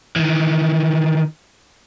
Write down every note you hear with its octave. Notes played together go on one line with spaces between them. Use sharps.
D#3 E3